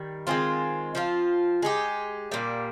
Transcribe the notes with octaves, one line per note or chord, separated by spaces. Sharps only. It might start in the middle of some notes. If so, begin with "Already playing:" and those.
Already playing: D#3 G3
D#3 G#3 C4 F4
F3 C4 F4
G#3 D#4 G4
A#2 G3 A#3